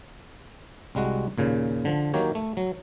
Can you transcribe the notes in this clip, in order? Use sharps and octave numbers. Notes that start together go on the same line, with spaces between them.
C2 G3 G#3 F#4
D#2 A#2 C#3
D3 F3
D#3 F#3 A#3 G4 C#5
A3
F#3